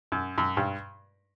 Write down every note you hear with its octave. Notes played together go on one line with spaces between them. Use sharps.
F#2
F#2
G2